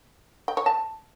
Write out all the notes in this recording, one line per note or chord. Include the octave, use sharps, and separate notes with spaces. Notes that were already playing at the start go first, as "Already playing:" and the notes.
G5
C#5
A5